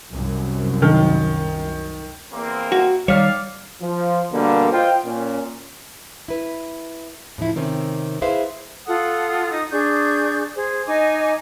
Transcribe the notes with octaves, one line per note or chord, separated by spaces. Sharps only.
C2 F#2
D#3
E2 A#3 C4
F#4
D#3 G3 C#5 D5 F5
F3
B2 D3 G3 A#3
F4 C5 D#5 G5
A#2 C#4
E4 B4
A2 C#3 F3 E4
C3 D#3 C4 C#4
E4 G#4 B4 C5 E5 F5
F4 A4 F#5 D#6
D#4 D#6
D4 G#4 C#6 G6
G#4 C5
D#4 D#5 G#5 D6